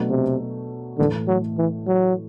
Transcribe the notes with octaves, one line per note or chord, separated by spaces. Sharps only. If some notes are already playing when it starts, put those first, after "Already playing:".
Already playing: B2 F#3 A3 D4
C3
A2 D3 E3 A3
F#3
E3
F#3